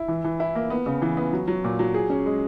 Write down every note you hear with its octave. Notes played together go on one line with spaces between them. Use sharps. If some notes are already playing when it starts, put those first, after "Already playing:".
Already playing: E4
E3
E3
E4
A#3
B3
C#3
E3
B3
F#3
F#3
A#2
F#3
G#4
C#4
G#3